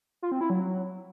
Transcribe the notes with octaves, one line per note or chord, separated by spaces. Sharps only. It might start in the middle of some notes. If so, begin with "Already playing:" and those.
F4
C4
E4
F#3